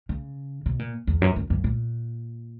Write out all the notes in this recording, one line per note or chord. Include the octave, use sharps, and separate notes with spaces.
C#3
B2
A#2
E2
F#2
F#2
F#2
A#2